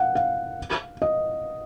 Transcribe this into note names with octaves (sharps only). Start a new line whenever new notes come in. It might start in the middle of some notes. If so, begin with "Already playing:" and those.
Already playing: F5 F#5
F5
D#5